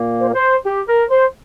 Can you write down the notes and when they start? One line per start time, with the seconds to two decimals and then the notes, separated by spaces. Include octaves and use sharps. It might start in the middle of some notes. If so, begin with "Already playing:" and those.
Already playing: A#2 A#3
0.20 C5
0.28 A#4
0.35 C5
0.65 G4
0.88 A#4
1.10 C5